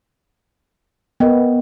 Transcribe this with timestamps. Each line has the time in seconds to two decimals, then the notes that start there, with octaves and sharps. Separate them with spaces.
1.20 B3 A#4 D#5 G5